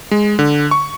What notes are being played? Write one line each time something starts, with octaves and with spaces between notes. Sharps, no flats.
G#3
D3
C#6